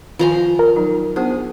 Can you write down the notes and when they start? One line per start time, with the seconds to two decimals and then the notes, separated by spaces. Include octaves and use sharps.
0.19 D#3 F3 F4 G#5 A#5 C6
0.59 A#4
0.76 F#3 D#4
1.16 B3 D4 G#4 C5